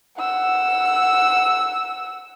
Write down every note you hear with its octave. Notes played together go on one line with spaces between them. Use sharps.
F#5 E6